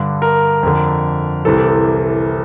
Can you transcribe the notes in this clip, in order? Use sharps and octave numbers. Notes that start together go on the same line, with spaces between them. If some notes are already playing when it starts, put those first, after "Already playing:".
Already playing: G2 D3
A#4
F2 D3
C2 C3 E3 A4